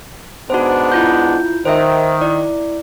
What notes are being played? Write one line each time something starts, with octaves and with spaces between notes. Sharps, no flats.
G#2 B3 D4 F#4 C5
E4 F4 G6
D#3 C5 E5
E4 D5